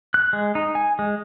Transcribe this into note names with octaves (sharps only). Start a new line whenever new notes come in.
F#6
G#3
D#4
G#5
G#3